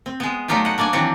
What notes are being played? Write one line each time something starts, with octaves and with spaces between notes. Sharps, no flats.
C4
G#3 B3
F#3 G3 A3 D#4 F4 G4
D#5 F#5
A#3 D4 D5 D#5 G#5
D#3 E3 F#3 C4 D4 F#4